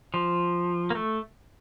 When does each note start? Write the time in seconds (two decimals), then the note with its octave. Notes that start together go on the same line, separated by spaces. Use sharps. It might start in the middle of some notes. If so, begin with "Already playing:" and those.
0.14 F3
0.90 A#3
0.95 A3